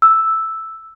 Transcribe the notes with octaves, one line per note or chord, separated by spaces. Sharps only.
E6